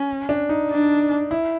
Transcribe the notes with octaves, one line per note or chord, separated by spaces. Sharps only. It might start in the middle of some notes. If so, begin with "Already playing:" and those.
Already playing: C#4
D4
D#4
D4
E4